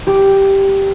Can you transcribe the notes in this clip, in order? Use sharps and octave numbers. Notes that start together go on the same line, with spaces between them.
G4